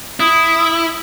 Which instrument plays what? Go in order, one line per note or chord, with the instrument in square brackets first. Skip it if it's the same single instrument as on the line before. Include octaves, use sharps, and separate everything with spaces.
[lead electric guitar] E4 [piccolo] D#6